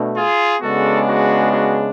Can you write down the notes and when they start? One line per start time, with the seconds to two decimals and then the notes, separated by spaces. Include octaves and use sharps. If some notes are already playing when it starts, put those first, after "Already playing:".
Already playing: B2 A3 D4
0.16 F4 G#4
0.61 C#3 G#3 B3 D4 F#4 A4
1.07 F#4
1.51 F#4